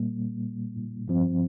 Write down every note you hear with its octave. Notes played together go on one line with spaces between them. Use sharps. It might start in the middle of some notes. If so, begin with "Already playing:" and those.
Already playing: A#2 G3 A#3
G2 F3 C4